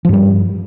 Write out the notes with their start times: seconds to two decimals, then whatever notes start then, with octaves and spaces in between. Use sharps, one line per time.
0.05 F3
0.09 G2
0.13 G3